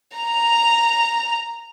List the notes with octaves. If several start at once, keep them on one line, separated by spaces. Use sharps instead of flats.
A#5 F7